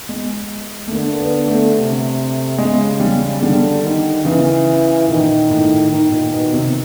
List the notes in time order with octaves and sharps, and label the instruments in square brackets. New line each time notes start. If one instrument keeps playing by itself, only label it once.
[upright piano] G#3
A3
[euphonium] D3 [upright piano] A#3
[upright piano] A#3
B3
A3
[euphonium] C3
[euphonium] C#3 [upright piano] G#3
[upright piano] G3
[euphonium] D3 [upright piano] G3
[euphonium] D#3
[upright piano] C#3 [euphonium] E3
[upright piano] A#2 [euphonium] D#3
[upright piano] A2
[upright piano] G#2 [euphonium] D#3
[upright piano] A#2
B2
C3